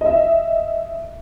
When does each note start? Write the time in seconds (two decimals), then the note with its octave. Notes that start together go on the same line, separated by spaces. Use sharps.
0.01 D#5 E5